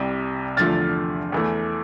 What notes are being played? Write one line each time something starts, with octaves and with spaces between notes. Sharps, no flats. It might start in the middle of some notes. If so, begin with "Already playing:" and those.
Already playing: C2 C3 G3
E2 D3 F3 A3 F6 A6
E2 E3 A3